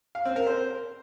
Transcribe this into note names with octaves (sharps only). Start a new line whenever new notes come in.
F5
C4
A#4
C5